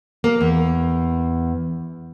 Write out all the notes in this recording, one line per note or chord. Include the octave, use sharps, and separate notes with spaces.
A#3
E2